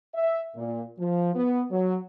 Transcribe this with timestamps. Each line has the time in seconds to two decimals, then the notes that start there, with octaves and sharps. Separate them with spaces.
0.14 E5
0.55 A#2
0.99 F3
1.34 B3
1.70 F#3